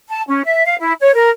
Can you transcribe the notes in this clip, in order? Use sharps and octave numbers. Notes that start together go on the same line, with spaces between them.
A5
C#4
E5
F5
E4
C#5
A#4